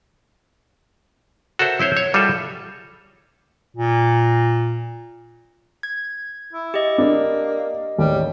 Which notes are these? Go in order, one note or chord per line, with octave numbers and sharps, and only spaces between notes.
F#4 A4 A#4 C5 E5
C4 E4 C5 C#5
C#5
G3 F4 F#4 G#4 A4 E5
A#2
G#6
E4
G4 D#5
A#3 D4
A1 D#2 D#3 G3